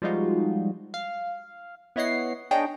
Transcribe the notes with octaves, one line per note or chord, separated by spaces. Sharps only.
F3 G3 G#3 D#4 F4 F#4
F5
B3 E4 C#5 D#5 F#5 C7
D4 D#4 G#4 C#5 D#5 G5